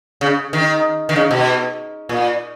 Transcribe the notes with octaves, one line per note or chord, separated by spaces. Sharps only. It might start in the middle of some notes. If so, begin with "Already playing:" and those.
C#3
D#3
D#3
C#3
B2
A#2